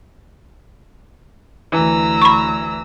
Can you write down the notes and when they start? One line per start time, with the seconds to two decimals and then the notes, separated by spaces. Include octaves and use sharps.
1.72 D2 E3 A#5 E6
2.22 B5 C#6